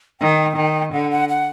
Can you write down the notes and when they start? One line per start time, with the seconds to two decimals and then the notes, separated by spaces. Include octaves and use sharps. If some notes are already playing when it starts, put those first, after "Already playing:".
0.20 D#3 G5
0.57 D#3
0.93 D3 F#5
1.11 F#5
1.29 F#5